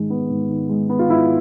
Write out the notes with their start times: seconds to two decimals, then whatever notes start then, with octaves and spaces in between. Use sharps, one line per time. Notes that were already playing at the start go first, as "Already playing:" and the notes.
Already playing: G#2 D#3 G#3
0.10 B3
0.30 G#2
0.49 D#3
0.69 G#3
0.89 B3
0.99 F4
1.09 G#2 E4